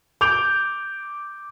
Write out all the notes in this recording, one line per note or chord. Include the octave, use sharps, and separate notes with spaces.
D6 G6 D7 F7